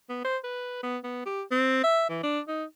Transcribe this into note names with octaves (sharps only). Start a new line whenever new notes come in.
B3
C5
B4
B3
B3
G4
C4
E5
E3
D4
D#4